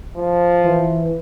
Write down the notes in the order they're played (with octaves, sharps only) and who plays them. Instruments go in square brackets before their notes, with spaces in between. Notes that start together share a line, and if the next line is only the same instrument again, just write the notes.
[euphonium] F3
[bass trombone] E3